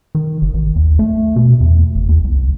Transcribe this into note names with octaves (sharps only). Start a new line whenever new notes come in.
D#3
F#1
A1
D#2
A3
B2
E2
F#1
D#2
C2